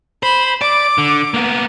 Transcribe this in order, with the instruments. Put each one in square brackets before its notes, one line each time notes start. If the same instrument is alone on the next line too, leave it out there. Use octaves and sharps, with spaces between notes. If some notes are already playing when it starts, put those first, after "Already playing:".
[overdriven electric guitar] C5 [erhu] B5
[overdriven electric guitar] D5 [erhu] D6
[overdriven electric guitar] D3
A#3 B3